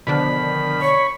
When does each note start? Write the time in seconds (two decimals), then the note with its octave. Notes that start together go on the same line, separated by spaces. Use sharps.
0.07 B2 D3 D#3 F3 D4 B5
0.82 C#5 C#6